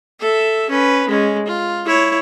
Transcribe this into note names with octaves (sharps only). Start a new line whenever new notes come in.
A4 E5
C#4 B4
G#3 C#4
F4
E4 C#5